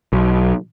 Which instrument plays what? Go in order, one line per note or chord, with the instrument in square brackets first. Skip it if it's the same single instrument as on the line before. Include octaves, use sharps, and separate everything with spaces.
[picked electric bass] B1